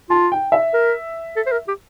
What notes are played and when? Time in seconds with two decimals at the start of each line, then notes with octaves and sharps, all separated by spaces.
0.10 F4 A5
0.32 G5
0.52 E5
0.74 A#4
1.36 A4
1.47 C5
1.52 A#4
1.68 G4